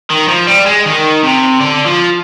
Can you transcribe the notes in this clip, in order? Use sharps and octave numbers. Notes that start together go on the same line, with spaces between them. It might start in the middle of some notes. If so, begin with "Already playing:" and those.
D#3
F3
G3
G#3
D#3
C3
D3
F3